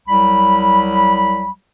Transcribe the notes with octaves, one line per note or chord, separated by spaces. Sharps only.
C2 F#3 G3 B5